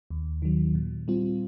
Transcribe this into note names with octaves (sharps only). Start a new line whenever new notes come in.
D#2
D#3 F#3
A#2
G3 C4 F4